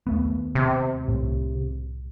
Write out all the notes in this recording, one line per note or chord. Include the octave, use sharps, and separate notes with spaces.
D#2 A3 B3
C3
C2 A2